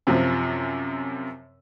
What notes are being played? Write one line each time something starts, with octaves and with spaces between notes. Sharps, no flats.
F#2 C3 F3